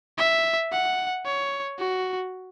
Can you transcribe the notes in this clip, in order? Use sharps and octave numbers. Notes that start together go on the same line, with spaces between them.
E5
F#5
C#5
F#4